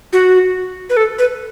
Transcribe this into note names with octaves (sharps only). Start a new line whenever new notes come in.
F#4
B4
A4
B4